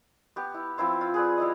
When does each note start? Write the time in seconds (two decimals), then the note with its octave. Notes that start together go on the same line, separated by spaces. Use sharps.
0.36 B3 G4
0.54 E4
0.78 F3 C4 E4 C5
1.01 F4
1.14 G#4 B4 D5
1.38 G3 E4 D#5